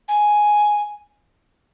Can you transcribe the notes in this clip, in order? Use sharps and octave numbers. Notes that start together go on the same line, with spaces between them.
G#5